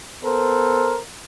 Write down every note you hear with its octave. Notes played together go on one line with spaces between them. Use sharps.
B3 A4 A#4 C5